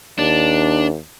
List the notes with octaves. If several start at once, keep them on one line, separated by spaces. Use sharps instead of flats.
D#2 D4